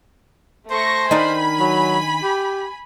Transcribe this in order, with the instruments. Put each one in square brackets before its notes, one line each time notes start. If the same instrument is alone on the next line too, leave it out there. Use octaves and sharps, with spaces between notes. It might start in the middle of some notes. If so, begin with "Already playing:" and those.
[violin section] A3 C#6 A#6 [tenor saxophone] C5
[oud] D#3 D4 D#4 [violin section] G#5 B5
[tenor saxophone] F#3
G4